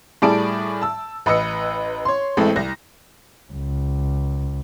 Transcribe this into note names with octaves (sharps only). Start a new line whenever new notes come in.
A2 G3 G#4 D5 A5 D7
A5 E6
A1 B4 D#5 E6 C#7
C#5 C6
A1 A2 G#3 A3 C4 A4
C2 A#6
C#2